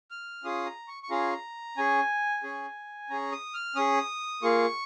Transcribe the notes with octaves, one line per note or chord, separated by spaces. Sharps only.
F6
C#4 F4 G#4 D#6
A#5
C#6
C#6
C#4 F4 G#4 A#5
C#4 G#4 G#5
C#4 G#4
C#4 G#4 A#5
D#6
F6
C#4 G#4 D#6
A#3 F4 G#4 C#6